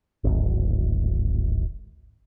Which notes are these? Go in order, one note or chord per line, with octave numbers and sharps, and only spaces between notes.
D1 G#1